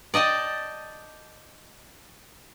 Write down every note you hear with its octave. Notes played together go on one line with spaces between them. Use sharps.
D5 D#5 G5 A5